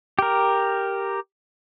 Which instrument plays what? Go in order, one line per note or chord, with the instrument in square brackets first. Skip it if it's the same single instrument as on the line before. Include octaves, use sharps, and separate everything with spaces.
[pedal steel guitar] G4 A#4